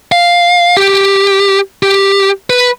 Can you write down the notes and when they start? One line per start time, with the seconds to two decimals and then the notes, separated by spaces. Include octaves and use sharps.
0.12 F5
0.77 G4
1.83 G4
2.50 B4